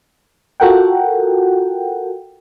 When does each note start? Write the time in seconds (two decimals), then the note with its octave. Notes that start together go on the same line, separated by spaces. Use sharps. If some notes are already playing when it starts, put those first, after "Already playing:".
0.60 F4 F#4 A4 A#4 F#5 G5